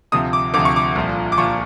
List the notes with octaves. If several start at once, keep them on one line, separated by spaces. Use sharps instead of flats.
D2 C3 F3 D#6
D6
D2 C3 F3 D6
C#6
D6
C2 A#2 F3
D6
A#2 F3 C#6